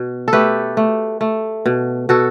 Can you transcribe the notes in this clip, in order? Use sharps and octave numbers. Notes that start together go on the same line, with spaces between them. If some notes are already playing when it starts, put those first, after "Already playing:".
Already playing: B2
A4
A3 G4 B4
A3
A3
B2
B2 F#4 A4